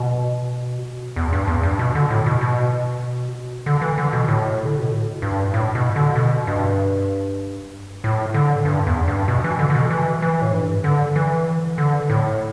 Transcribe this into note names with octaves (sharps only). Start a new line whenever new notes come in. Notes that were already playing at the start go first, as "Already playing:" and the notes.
Already playing: B2
E2
G2
E2
G2
B2
D3
A2
B2
B2
D3
E3
D3
B2
A2
D3
B2
A2
G2
A2
B2
D3
B2
G2
A2
D3
G2
E2
G2
B2
E3
D3
D3
B2
E3
E3
A2
G2
D3
E3
D3
A2